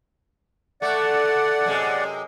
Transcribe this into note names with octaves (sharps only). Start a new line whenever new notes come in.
A3 D5 F#5
F#2 C3 G#3